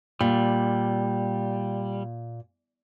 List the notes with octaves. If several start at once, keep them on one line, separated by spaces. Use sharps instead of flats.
A#2 G3